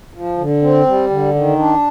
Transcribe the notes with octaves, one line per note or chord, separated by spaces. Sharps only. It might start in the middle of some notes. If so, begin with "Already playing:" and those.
F3
D3
C4
G3
D3
D#3
D4